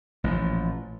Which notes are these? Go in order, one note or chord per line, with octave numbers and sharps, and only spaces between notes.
A1 A#2 F3